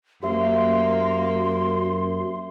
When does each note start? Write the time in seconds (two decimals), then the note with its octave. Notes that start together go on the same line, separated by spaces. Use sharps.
0.23 F#2 A#3 G4 C5 E5 C6